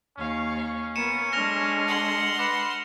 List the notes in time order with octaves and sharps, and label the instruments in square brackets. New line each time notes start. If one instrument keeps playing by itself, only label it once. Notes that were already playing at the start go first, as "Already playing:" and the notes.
[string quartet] D#2 F5 C#6 [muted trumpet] C#4
[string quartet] B3 F4 A#4 [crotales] C#7 D#7 E7
[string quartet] G#3 D4 A4 [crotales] F6 A#6 F7
[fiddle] F#5 C6
[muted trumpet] B4 [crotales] D6 A#6